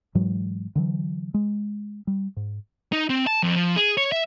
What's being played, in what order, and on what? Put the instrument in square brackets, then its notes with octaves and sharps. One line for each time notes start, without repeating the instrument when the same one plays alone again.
[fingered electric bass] G#2 E3 F#3 G#3
D3 E3 F#3
G#3
G3
G#2
[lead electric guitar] D#4
C4
A5
F2
F3
G#4
C#5
E5